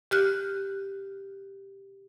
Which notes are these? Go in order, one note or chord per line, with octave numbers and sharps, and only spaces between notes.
G4 F6 F#6